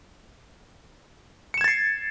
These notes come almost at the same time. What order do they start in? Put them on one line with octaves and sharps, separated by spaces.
C#7 E7 G#6 A6 C7